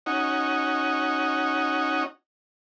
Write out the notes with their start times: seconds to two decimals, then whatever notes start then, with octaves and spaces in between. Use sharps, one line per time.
0.06 C#4 D#4 F#4